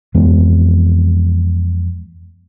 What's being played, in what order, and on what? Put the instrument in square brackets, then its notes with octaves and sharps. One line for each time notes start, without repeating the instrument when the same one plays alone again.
[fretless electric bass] F2 E3 G#3 B3